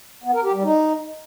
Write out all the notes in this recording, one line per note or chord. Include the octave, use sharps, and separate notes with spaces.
B3
A#4
G4
G3
D#4